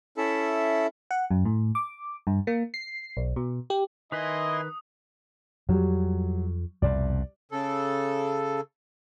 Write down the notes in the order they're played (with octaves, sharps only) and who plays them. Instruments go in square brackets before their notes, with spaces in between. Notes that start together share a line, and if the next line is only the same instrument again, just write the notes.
[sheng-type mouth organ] C#4 E4 A4 E5
[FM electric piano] F#5
F#2
A2
D6
G2
A#3
C7
B1
B2
G4
[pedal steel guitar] D#3 B4 B5 [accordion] E4 G#5 C6 [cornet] D#5 [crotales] D#6
[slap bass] F2 [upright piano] F#3 G3
[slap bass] C2 F2 B2 [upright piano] D5
[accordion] C#3 A4